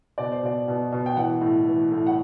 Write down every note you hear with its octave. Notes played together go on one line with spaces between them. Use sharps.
B2 D5
C5
B2 D5
B2
B2
G5
E3 F#5
A2
E3
A2
F#5